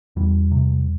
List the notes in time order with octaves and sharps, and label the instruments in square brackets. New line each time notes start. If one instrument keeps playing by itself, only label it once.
[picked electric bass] E2 G3
C3